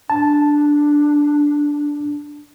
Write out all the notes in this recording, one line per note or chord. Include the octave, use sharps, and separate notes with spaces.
D4 A5